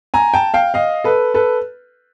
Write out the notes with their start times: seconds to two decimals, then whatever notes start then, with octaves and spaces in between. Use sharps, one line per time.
0.14 G#5 A#5
0.34 G5 A5
0.54 F5 G5
0.74 D#5 F5
1.04 A4 B4
1.34 A4 B4